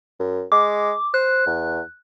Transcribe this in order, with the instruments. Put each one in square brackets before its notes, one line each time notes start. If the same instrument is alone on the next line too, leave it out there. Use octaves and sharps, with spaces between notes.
[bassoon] F#2
[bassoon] G#3 [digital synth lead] D6
[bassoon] C5 [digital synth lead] F#6
[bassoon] E2